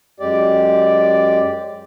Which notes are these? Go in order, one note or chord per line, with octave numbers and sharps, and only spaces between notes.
F#2 G#3 G4 D5